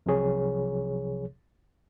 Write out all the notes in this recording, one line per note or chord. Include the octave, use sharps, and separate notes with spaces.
C2 C3 F3 F#3 G#4 C#5